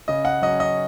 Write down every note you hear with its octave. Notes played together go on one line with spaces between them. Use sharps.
C#3 D#5
F#5
F#3 C#4 D#5
D#5